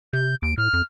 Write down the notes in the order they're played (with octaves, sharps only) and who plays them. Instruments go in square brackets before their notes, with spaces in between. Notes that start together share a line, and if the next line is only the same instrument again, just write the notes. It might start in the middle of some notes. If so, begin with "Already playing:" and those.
[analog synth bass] C3 [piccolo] G6
[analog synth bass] D#2 [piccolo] D7
[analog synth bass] A2 [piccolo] F6
[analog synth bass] F2